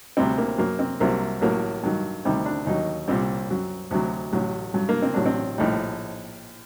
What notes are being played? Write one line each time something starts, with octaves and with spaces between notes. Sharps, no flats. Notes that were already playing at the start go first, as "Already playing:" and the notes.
D2 C3 G3 C4
A#3
F#2 F#3 A#3
C4
C2 C3 F#3 A#3
A1 A2 F#3 A#3
G2 D#3 F#3
D2 C3 D#3 G3 C4
D4
D#2 D#3 F#3 D#4
C2 A#2 G3 C4
F#2 F#3
D2 C3 F#3
A1 A2 F#3
G2 F#3
A#3
C4
A1 A2 F#3 D4
C4
A#1 A2 G3 D#4